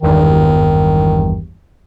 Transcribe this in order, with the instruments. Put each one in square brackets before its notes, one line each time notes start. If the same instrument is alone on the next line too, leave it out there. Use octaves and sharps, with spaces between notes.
[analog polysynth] G#1 E2 G2 [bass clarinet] D#3